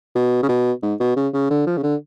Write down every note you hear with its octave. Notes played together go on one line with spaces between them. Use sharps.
B2
C#3
B2
G#2
B2
C#3
C#3
D3
F3
C#3
D3